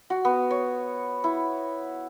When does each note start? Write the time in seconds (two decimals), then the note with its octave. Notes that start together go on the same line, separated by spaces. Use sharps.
0.10 F#4
0.25 B3
0.51 C#5
1.24 E4